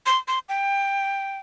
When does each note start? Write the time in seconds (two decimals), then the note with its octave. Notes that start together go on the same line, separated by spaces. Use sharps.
0.06 C6
0.28 C6
0.49 G5